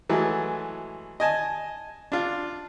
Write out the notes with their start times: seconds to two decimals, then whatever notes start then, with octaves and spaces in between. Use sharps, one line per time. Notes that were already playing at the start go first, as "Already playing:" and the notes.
0.10 E3 F#3 G#3 A3
1.20 D#5 G#5 A5
2.12 D4 F4